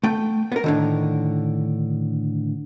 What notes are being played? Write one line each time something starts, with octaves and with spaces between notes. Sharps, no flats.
A3 G5
B3 A#4
A2 D3 D#3